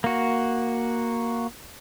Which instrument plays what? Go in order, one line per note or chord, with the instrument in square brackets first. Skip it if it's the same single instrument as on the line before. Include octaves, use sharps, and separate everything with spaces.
[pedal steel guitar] A#3 F#4